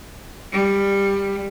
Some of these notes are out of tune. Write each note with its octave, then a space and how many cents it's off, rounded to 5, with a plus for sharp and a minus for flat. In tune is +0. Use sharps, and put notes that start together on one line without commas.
G3 +15